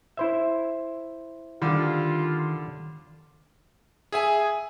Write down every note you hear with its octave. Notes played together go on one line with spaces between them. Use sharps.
E4 C5 E5
D3 D#3 G3 F4
G#4 E5 G#5